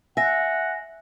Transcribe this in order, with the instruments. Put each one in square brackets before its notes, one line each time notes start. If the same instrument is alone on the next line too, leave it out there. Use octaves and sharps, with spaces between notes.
[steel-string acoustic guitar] E5 [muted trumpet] F#5 [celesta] G#5 A#6